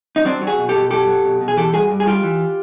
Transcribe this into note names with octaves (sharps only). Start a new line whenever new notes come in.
D#4
F#3 C4 D4
F#3
F#4 G#4
B2
G4 A4
B2
F#3 G4 A4
F#3
B2
B2
G#4
E3 G4 A4
G2 F#4 G#4
G2
G#4
G3 F4 G4
E3